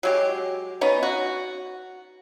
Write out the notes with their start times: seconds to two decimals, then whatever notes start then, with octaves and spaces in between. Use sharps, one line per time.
0.03 F#3 G#3 G4
0.81 B3 C#4 D#4
1.03 F#4